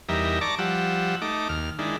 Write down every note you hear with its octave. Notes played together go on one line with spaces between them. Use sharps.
E2 G3 D#4 A#4 E5
D5 A5 A#5 C#6 D6
F3 G3 F#5 E6
A3 D#4 D6
D#2 F6
D#3 G#3 D4 E4